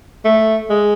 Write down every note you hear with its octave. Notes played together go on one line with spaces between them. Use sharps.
A3
G#3